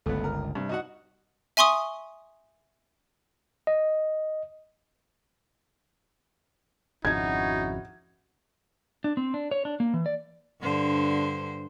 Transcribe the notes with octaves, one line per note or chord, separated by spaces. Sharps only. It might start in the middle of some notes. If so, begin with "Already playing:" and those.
G1 C#2 A3 B3
A#4
G2 C3
D#4 F#4 F#5
E5 G#5 C6 C#6 D#6
D#5
G#1 F2 C#3 C#4 D#4 E4 F#4 G#6
D4
C4
D4
C#5
D4
A#3
E3
D5
G2 D3 C5